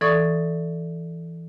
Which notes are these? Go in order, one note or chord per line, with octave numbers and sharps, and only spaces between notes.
E3 A4 D5 C#6 D#6